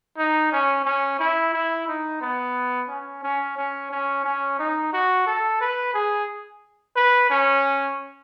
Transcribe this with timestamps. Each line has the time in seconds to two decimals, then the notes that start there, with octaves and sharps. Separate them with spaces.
0.17 D#4
0.52 C#4
0.85 C#4
1.19 E4
1.53 E4
1.88 D#4
2.21 B3
2.89 C#4
3.23 C#4
3.57 C#4
3.91 C#4
4.24 C#4
4.59 D#4
4.93 F#4
5.26 A4
5.61 B4
5.94 G#4
6.96 B4
7.30 C#4